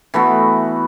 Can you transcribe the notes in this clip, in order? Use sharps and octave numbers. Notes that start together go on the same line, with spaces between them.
E3 A3 B3 F#4